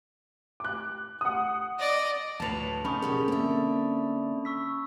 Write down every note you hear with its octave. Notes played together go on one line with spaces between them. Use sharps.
D6 F#6
F#5 D#6
D5 D#5
D2 A2 B4 C#5 A5 A6 F7
C#3 C4 C#4 D#4 B5 C#6 D#6
B2 C4 G4 G#4 A#4
D3 A#3 C4 E5
C#6 E6 B6